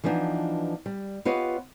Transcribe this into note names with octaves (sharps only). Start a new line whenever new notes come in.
E3 F3 B3 D4 D#4
G3
B3 F4 G4 B4 C#5 D#5